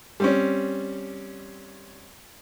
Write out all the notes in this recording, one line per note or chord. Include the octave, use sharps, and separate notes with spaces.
G3 C4 C#4